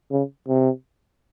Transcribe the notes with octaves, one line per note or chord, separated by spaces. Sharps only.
C#3
C3